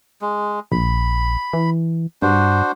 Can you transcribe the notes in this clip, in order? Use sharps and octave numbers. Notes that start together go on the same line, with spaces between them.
G#3
A#1 B5
E3
G2 D4 F#4 C5